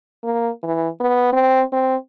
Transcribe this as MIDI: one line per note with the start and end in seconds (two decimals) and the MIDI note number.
0.24 0.49 58
0.63 0.88 52
1.00 1.31 59
1.33 1.62 60
1.73 1.96 60